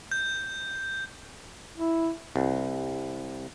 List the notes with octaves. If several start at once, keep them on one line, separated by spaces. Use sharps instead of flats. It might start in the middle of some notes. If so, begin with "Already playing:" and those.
G6
E4
C2